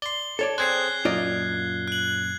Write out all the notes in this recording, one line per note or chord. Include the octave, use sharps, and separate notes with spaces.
D5 C6 G7
A4 C#5 D5 A5
C4 G#4 C5 F#6 G#6 C7
F#2 A#2 F4 D5 D#5
F#6 F#7